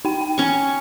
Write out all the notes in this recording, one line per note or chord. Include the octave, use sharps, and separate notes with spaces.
D#4 G5
G5
C#4 C#6